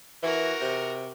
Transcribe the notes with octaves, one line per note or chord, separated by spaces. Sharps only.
E3 F#4 A#4
C3